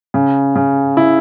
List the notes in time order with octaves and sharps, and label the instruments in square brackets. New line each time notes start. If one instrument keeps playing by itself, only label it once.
[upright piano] C#3
C#3
E4